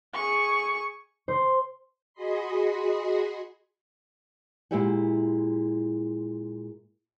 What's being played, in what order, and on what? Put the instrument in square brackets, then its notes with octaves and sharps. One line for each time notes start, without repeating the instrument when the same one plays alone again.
[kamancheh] G#4 C#6
[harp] C5
[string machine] F#4 G#4 D#5 B5 C6
[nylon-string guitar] A#2 G#3 E4 G4 C#5 F#5